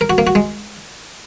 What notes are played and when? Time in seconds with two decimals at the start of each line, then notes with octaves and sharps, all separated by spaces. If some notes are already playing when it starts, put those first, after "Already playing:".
0.01 A#4
0.10 F#4
0.18 A#3
0.27 F#4
0.35 G#3